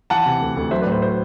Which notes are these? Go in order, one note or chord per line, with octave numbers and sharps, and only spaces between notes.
E3 F#5 A5
C3
D2
D2
F#3 C5 E5
B4 D5
A2
C5
A3 C5